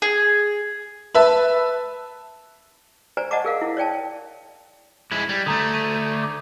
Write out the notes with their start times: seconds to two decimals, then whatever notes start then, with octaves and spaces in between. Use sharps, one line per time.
0.02 G#4
1.14 B4 E5 A5
3.17 C5 D5 G#5 A#5
3.31 D5 D#5 F#5 A5 A#5 D6
3.44 G#4 A#4 F5
3.61 E4
3.77 C#5 D5 G5 A5
5.11 G#3 E4 G#6 F#7
5.29 G3 G6
5.46 D3 A3 A#5 D#6
5.74 D#7
6.24 D6